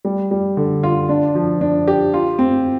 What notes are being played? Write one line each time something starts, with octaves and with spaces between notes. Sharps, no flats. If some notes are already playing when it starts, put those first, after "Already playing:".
G3
G3
D3
F4
D4
F3
D4
G4
F4
C4